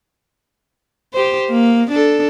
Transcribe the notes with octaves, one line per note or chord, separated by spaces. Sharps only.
G4 C5
A#3
D4 A4